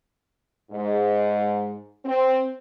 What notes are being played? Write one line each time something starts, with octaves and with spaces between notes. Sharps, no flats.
G#2
C4